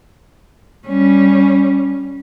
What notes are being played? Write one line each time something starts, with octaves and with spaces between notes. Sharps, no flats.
G3 C#4